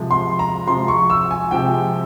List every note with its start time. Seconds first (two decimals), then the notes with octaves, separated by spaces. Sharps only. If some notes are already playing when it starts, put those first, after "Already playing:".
Already playing: C3 F3 G#3
0.11 C6
0.39 A#5
0.67 C3 F3 G#3 C6
0.88 C#6
1.10 E6
1.31 G#5
1.51 C3 F3 G#3 G5